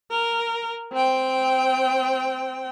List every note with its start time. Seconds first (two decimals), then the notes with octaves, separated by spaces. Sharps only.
0.10 A#4
0.92 C4 G5